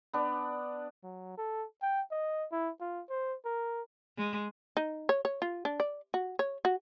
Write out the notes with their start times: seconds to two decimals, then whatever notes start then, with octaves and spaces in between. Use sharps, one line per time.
0.13 B3 D4
1.04 F#3
1.38 A4
1.82 G5
2.11 D#5
2.52 E4
2.81 F4
3.09 C5
3.45 A#4
4.18 G#3
4.77 D#4
5.09 C#5
5.25 C#5
5.42 F4
5.65 D4
5.80 D5
6.14 F#4
6.39 C#5
6.65 F#4